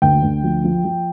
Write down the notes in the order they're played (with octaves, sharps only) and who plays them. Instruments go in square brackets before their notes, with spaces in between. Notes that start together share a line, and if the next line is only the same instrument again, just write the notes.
[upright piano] D2 G5
D2
F3
F3
F3